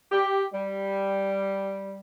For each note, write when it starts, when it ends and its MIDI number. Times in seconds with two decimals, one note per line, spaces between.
0.12 0.45 67
0.54 2.00 55